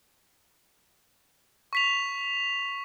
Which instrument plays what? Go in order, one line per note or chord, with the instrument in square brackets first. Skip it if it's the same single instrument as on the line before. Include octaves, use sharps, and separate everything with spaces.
[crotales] C#6 B6 F7